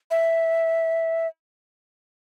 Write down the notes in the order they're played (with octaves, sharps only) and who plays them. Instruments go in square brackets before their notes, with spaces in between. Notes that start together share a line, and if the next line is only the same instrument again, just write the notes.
[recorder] E5